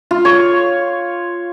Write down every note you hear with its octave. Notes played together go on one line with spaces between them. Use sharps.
F4
C#5